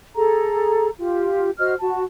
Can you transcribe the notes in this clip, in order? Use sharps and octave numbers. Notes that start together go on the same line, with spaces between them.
G#4 A4 A#5
F4 G4
F#4 C5 D#5 F6
F#4 A5